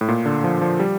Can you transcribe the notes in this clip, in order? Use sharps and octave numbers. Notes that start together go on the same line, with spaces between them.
A2
A#2
D3
F3
F3
G3